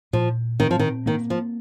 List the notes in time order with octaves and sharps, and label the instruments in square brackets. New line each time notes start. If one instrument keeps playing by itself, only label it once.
[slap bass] A#2 [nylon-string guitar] F3
[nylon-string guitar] D#3 [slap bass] C4
[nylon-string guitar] F3
D#3
[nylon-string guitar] D#3 [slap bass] A#3
[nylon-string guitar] F3